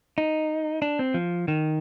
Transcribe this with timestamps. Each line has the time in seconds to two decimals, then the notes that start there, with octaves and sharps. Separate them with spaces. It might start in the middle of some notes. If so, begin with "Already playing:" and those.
0.18 D#4
0.82 D4
0.99 C4
1.14 F3
1.48 D#3